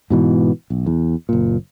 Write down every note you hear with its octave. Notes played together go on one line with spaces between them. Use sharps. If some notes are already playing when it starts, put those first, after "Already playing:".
G#2 B2 E3
B1
E2
F#1 A#2